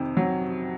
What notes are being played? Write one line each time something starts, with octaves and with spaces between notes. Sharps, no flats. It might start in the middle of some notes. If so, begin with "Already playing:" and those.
Already playing: F2 C3 D#3
F#3